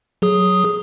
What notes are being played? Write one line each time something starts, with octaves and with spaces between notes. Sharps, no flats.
F#3 G#4 D#6